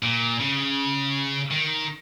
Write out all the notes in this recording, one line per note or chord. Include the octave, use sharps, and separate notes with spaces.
A#2
C#3
D#3